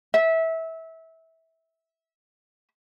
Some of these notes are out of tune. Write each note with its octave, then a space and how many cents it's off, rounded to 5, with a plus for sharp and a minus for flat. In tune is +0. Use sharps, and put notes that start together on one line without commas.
E5 -20